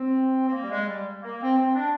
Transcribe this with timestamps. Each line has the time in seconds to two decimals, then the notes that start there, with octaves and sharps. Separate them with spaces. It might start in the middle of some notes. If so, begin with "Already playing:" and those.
Already playing: C4
0.46 C4
0.52 A#3
0.62 G3
0.70 G#3
0.87 G3
1.22 A#3
1.40 C4
1.58 C4
1.74 D4